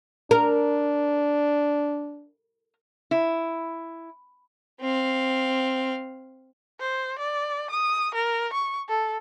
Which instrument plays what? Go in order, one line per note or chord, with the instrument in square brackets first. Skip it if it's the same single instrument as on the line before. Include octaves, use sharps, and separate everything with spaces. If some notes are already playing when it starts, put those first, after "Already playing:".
[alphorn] D4 [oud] A#4
[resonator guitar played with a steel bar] E4
[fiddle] C4 F5
[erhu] C5
D5
D#6
A#4
C#6
A4